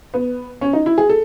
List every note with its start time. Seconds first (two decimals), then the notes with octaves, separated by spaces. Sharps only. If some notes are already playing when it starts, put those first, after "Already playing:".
0.14 B3
0.61 C#4
0.73 D#4
0.86 E4
0.98 G#4
1.10 A4